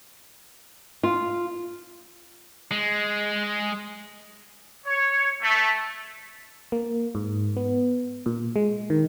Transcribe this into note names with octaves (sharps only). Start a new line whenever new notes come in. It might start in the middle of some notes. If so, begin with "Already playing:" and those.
F4
G#3
C#5
A3
A#3
G#2
B3
A#2
G#3
D#3